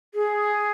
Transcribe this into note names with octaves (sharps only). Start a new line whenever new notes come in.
G#4